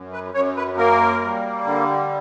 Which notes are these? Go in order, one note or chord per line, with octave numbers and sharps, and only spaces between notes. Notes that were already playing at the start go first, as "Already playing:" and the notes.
Already playing: F#2
B4
F#2 C#5
B4
A#3 A#4
G3
D3